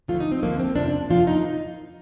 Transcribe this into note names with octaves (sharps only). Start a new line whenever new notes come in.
D2 D3 F3 A3 F4
D#4
C4
D2 D3 F3 A3 A#3
C4
F2 C3 F3 A#3 D4
F2 C3 F3 A#3 F4
D#4